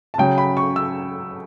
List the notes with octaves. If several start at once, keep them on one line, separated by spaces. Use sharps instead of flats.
A5
C#3 F#3 G5
B5
C#6
E6